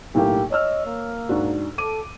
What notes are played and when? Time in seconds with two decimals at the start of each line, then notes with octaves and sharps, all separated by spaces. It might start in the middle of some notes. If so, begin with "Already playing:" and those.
0.15 B1 A2 A#3 G4
0.51 C#5 D#5 E6 F6
0.86 A#3
1.29 G#2 D4 F#4
1.78 A4 D6 D#7